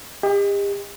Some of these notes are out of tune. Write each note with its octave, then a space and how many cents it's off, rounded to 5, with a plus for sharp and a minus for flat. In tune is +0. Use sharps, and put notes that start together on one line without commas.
G4 +40 D#5 +0